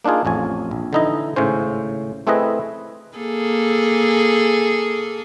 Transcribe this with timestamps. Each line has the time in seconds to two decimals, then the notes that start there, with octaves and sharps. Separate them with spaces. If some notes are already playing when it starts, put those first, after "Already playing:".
0.05 A#3 D4 D#4 F4 G#4
0.25 A1 F2 C#5 G#5
0.71 A#1
0.93 D3 E3 D#4 E4 D#5
1.36 G#1 A2 C#3 C#4 C5
2.27 A3 C4 E4 G#4 B4 D#5
3.17 A#3 G#4 A4